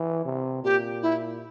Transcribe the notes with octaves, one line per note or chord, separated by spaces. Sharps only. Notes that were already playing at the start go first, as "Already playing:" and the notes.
Already playing: E3
C3
A#2 G4
E4